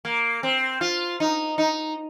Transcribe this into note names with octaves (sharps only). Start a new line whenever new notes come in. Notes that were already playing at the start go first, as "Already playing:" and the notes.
A#3
C4
F4
D#4
D#4